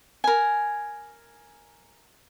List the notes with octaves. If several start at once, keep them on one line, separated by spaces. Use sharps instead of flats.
A#4 G#5